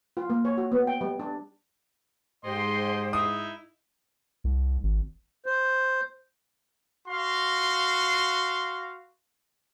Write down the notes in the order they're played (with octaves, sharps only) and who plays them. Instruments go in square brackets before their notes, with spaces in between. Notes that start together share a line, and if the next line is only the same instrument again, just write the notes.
[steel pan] F4
A#3
C#5
F#4
B3
G5
G3
D4
[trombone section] G#2 [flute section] G4 C5 [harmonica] D#5 C6
[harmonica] D#4 E4 [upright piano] D#6
[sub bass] C2
G#1
[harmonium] C5
[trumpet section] F#4 F5 C6